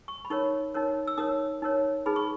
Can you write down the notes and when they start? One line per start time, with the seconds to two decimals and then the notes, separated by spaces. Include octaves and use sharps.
0.08 C#6
0.25 B5
0.30 D#4 A#4 C#5 C#6
0.74 D#4 A#4 C#5
1.07 E6
1.18 D#4 A#4 C#5 D#6
1.62 D#4 A#4 C#5
2.06 D#4 G#4 B4 B5
2.16 C#6